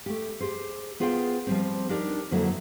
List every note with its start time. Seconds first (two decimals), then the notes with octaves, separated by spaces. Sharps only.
0.06 A3 G4
0.40 G4 G#4 C5
1.00 B3 F4 G#4 C5 D#5 G5
1.47 F3 G3 C4
1.89 D4 D#4 G4 A#4 D5
2.31 F2 D3 F#3 A#3 E4 A4